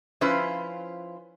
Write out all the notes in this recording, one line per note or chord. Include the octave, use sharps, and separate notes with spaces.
F3 C#4 E4 F4 B4 C5